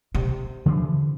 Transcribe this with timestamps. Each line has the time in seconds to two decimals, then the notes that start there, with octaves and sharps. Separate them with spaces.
0.15 C3
0.66 C#3 E3 F3